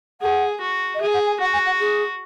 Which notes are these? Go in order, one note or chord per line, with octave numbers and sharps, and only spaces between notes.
G#4 F#5
F#4
D#5
G#4 E5
F#5
G#5
F#4 F#5
G#5
F#5
G#4